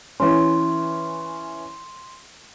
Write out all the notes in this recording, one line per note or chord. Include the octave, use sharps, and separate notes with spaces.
E3 C#4 C6